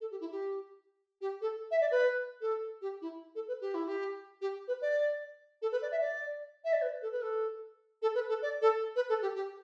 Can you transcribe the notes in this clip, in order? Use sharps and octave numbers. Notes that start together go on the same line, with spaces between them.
A4
G4
E4
G4
G4
A4
E5
D5
B4
A4
G4
E4
A4
B4
G4
E4
G4
G4
B4
D5
A4
B4
D5
E5
D5
E5
D5
B4
A4
B4
A4
A4
B4
A4
D5
A4
B4
A4
G4
G4